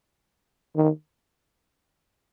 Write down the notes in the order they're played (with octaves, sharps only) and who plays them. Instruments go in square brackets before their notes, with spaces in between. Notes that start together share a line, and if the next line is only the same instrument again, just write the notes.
[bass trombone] D#3